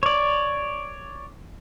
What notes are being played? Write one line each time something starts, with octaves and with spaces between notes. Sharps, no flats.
C#5 D5